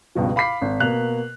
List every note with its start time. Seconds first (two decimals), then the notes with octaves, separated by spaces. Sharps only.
0.15 C#2 G2 B2 F3
0.36 F5 B5 D6 B6 C7
0.61 G#1
0.80 B2 A#3 A#4 F#6 F7